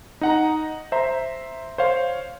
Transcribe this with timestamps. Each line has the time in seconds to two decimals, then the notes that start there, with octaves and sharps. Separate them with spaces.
0.21 D#4 F#5 A#5
0.92 C5 E5 A#5 C6
1.78 C5 C#5 F5